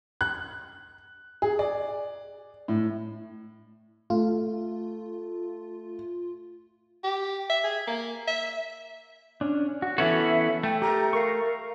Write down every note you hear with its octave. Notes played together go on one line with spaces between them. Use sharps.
F#6
G#4
D5
A2
A3 F4
G4
E5
G#4
A#3
E5
C#4 D4
F#4
E3 B3 C#4 F#4 A4 E5 C#6
A3 G5
G4 A#5
A#4 F5 C#6